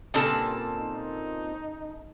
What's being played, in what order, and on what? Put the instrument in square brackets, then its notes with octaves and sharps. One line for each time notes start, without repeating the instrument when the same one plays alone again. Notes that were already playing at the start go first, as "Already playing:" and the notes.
[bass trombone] G2 [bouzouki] A#2 C4 A5 [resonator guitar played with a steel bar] C#3 D4 A4
[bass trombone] D#4